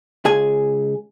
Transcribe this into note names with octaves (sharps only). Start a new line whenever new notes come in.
C#2 G#4 G#5